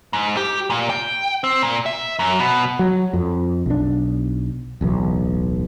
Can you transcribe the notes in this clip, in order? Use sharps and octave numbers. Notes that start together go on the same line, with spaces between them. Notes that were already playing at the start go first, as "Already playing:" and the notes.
G#2
G4
A#2
G5
C4
A#2
E5
F#2
B2
F#3
F2
B1 D4
D1 B1 E3